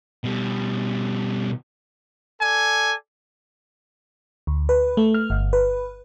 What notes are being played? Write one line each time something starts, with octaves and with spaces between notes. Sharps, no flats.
B2 G3
A4 D5 G#5
D2
B4
A3
F6
G1
B4